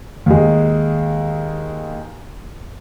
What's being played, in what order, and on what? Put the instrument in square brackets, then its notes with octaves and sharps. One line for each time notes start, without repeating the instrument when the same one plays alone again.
[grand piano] D#2 G#3